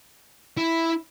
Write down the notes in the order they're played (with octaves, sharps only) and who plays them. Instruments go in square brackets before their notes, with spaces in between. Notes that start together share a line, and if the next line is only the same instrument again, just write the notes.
[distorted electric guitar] E4